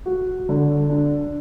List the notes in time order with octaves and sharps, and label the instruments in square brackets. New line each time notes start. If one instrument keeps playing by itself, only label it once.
[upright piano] F#4
D3
D4